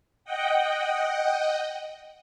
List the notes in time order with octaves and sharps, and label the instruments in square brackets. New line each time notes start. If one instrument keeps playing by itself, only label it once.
[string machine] D#5 F#5 G5